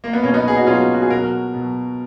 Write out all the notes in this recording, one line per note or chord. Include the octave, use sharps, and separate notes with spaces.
A#3
B3
B2 F#3 A#3 C#4
B3 D#4
G#4
D#4 F#4
B2 F#3 C#4 F4
F#4
G#4
B2 F#4 A#4
F#3
B2 F#3